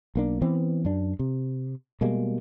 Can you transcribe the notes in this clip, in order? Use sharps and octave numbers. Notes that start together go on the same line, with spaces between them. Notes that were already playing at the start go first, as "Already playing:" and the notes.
B1 A#3 D4
E3 B3 C4
F#2 D4
C3
B2 G3 G#3 A#3